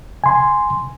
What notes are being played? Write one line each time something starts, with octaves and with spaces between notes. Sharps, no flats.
G#5 C6